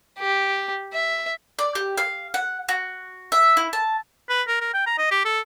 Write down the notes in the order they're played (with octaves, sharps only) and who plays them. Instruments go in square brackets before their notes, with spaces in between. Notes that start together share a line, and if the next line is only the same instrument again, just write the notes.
[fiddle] G4
E5
[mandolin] D5
G4
F5
F#5
F#4
E5
E4
A5
[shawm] B4
A#4
A#4
G5
A#5
D#5
G4
A4